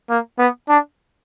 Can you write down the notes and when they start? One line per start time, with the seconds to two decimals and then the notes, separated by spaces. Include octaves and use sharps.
0.10 A#3
0.39 B3
0.69 D4